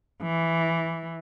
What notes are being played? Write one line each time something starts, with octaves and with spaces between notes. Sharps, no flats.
E3